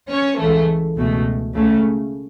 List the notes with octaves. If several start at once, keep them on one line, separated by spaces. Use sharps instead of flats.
C#4 C#5
C#2 C#3 E3 A3
C#2 B2 A3
C#2 C#3 A3